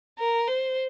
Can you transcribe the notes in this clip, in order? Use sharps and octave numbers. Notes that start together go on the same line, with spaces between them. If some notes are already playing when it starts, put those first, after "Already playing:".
A#4
C5